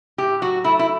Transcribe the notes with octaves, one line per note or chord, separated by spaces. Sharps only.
A2 G4
F#3 F#4
A3 E4
E4